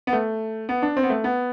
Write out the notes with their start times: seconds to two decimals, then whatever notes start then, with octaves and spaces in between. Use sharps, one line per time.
0.07 B3
0.13 A3
0.69 B3
0.82 D4
0.97 C4
1.03 B3
1.10 A3
1.24 B3